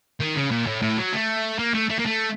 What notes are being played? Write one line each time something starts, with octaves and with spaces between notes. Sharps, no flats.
D#3
C#3
A#2
A2
A2
F#3
A3
A#3
A3
A3
A#3
A3